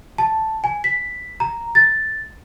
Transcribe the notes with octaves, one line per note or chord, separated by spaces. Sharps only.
A5
G#5
B6
A#5
A6